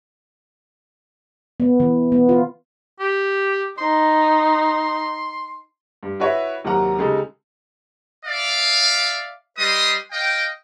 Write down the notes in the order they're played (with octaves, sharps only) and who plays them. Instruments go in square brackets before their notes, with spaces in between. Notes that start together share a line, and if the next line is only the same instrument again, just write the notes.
[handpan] B3
E3
B3
F4
[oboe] G4
[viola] D#4 [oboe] C6
[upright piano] G2
E4 F#4 B4 C#5 E5
D#2 C3 F#3 A#4 F#5 A#5
C#3 G#3 D#4 G4 A4
[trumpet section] D5 E5 F5
G3 B4 D#5 C6 D#6
D#5 F5 G5